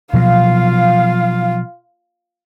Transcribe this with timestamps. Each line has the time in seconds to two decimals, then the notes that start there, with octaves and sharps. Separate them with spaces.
0.13 B2 F3 F#3 F4 F5